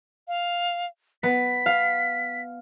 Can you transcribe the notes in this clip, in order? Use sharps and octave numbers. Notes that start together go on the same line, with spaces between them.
F5
B3 B6
F5